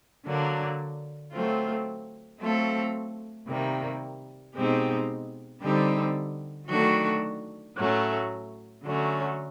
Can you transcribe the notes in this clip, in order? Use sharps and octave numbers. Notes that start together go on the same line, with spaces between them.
D3 F#3 A#3 D4
F#3 A3 C4 F4
F#3 A3 C4 F4 A4
C3 D#3 G3 A#3
B2 G#3 C4 D#4 G4
D3 G3 C4 D#4 G4
D#3 F#3 A3 D4 F#4
A2 F#3 A3 C#4
D3 F#3 A3 C#4